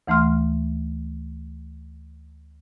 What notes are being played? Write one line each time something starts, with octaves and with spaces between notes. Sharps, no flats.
D2 E3 A3 C6 F6